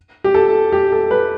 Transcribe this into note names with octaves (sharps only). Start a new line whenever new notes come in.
G4
A4
G4
A4
B4